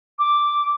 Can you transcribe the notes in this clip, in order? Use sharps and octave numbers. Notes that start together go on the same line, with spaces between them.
D6